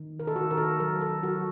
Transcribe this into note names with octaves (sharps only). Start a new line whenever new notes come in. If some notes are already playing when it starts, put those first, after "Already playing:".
Already playing: D#3
A#4
A4
D#3 F#4
A#4
A4
F#3 A#4
A4
F#3 F#4